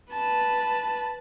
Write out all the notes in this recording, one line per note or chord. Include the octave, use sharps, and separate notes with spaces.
B4 A5